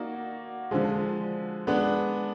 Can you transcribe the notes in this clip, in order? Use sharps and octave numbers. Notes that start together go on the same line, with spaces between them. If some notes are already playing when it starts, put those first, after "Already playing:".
Already playing: A#3 D#4 F#4 D5
D3 F3 G#3
G#3 B3 D4